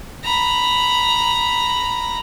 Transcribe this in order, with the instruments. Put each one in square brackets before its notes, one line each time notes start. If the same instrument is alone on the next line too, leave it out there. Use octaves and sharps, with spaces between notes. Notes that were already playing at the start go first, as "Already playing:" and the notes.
[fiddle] A#5 B5